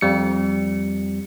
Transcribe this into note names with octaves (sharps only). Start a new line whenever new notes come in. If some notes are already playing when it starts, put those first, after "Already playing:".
F2 G3 C#7